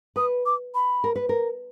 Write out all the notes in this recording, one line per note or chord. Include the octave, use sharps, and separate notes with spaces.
B4 D#6
D6
B5
A#4
B4
A#4